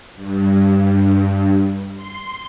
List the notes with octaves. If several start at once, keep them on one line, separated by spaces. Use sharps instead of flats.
G2
C6